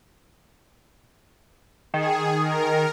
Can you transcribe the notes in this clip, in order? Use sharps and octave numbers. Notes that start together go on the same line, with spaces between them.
D#3 G#4
A#4